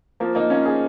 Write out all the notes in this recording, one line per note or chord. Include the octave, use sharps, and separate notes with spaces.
F3 A#3
A#3 D#4
C#4 F4
D#4 G#4